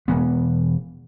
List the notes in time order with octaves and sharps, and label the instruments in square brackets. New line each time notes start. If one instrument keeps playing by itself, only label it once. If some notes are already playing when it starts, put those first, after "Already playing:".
[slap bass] E1 E3 B3